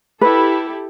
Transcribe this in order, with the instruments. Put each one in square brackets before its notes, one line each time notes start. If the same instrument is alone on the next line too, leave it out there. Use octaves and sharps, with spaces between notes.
[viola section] E4 G4 A4 [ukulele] B4